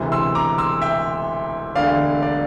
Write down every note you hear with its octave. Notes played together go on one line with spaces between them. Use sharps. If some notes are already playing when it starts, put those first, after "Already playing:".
Already playing: E1 D2 C3 E3
C6 E6
A#5 D6
C6 E6
E5 G5
E1 D2 D3 D5 F5
D5